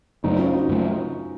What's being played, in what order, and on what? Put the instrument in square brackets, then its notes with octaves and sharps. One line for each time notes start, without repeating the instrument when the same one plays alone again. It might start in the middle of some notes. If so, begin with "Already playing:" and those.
[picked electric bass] F#2 C#3 F#3 A3 [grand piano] C4 D#4
[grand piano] C#4 F4
D#4 F#4
[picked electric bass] F#2 C#3 F#3 A3